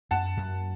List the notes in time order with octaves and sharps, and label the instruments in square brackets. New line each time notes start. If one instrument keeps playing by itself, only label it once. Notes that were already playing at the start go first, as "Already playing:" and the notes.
[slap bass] F#2 [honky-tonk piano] F#5 A5
[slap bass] F#2